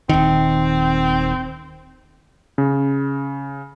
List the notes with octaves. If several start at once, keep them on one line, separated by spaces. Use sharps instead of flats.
D#1 D#3 C4
C#3